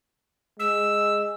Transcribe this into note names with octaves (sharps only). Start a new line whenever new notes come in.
G#3 E6